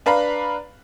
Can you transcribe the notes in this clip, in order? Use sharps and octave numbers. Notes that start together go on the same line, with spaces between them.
D4 B4 F5 A#5 B5